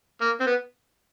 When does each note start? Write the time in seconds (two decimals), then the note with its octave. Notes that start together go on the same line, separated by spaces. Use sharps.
0.21 A#3
0.40 C4
0.47 B3